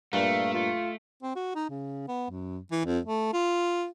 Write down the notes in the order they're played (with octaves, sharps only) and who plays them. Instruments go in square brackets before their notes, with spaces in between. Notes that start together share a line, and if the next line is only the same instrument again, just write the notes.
[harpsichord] G2 A#2 [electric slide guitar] A3 [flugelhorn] F5
[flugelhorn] F4
[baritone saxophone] C4
F#4
D#4
C#3
B3
F#2
E3
F2
A3
F4